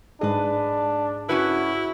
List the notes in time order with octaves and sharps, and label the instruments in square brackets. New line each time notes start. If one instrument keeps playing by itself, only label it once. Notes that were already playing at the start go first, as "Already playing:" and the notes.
[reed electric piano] G#2 G#4 [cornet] D4 [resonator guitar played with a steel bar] B4 D#5
[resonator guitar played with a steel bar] C#4 F#4 B4 [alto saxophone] E4